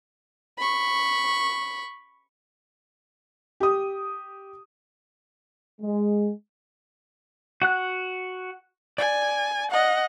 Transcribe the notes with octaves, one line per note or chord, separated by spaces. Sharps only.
B5 C#6
G4 D#6
G#3
F#4 F#5 F#6
D5 G#5
D#5 F#5